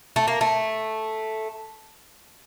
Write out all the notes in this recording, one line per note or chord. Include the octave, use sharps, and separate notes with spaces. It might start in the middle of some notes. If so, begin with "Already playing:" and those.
A3
A#3
A3